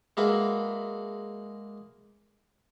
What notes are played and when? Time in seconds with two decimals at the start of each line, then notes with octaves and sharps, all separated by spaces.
0.17 G#3 A#3 F#4 B4 E5